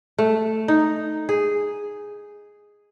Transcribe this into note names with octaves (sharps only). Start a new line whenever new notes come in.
A3
D#4
G#4